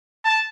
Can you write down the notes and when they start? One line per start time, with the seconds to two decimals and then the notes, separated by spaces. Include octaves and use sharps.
0.25 A5